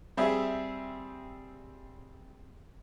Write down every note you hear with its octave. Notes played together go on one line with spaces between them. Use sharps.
G3 C4 G#4 E5